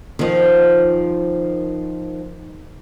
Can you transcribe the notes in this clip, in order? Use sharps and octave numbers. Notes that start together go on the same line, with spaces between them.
D#3 F3